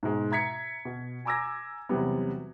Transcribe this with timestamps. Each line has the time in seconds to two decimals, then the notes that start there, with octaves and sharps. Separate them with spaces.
0.03 G#2 B2 G#3
0.31 E5 A#5 G#6 B6 C#7
0.85 B2
1.25 G#5 A#5 D6 E6 G#6 A#6
1.89 E2 C3 F#3 G3 B3